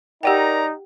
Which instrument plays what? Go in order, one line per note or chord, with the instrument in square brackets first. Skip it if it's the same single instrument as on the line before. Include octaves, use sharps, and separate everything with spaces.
[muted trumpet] D#4 [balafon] G4 F#5 G5 [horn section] A#4 D5 A#5